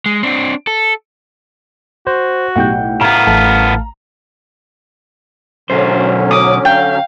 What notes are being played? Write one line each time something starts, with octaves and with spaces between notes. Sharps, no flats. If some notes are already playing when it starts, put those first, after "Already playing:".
G#3
C4 D4
A4
F#4 C5
B1 A2 G4 F#5 G5 G6
A2 B3 F5 A#5
A1 A3 A5
B1 D3 F#3 C#4 C5
D6 D#6
F5 G5